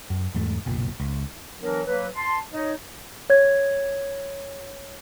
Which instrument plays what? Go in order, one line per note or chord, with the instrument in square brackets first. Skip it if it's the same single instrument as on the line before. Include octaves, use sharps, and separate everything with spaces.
[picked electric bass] F#2
E2 G#2 A3
F#1 B1 A#2
C#2
[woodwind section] E3 F#3 B3 D4 A#4
F#3 A#3 B4
A5 C6
D#4 C#5 D#5
[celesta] C#5 G#6